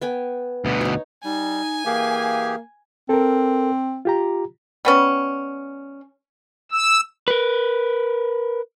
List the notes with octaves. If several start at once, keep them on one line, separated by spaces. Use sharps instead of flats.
B3 G5 G#5
D2 B2
D#4 C#5
G3 D#4 G#5
E3 A#3 G4 G#4 F5
C4 A4 A#4
F4 G4 A#5
G3 B3 C#4
E6
A#4 B4